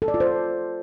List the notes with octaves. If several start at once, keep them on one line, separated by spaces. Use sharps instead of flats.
A4
D5
F4
C5